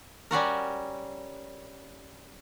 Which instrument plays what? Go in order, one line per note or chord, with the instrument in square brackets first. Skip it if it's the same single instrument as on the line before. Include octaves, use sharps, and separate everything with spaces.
[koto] G3 C#4 F#4 A#4